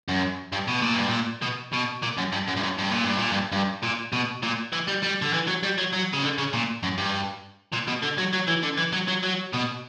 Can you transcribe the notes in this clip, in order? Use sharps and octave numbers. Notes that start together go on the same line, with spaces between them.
F#2
G2
B2
A#2
G2
A#2
B2
B2
A#2
F#2
G2
F#2
G2
F#2
G2
A#2
G2
A#2
G2
G2
A#2
B2
A#2
E3
G3
G3
D3
E3
F#3
G3
F#3
F#3
C#3
D3
C#3
A#2
F#2
G2
A#2
B2
D3
F#3
F#3
E3
D3
E3
F#3
F#3
F#3
B2